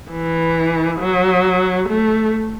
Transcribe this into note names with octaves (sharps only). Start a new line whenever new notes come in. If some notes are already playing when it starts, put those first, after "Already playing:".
E3
F#3
A3